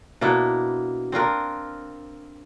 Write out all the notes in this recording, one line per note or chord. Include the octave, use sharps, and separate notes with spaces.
B2 A#3 D4 E4
C4 D4 F4 A#4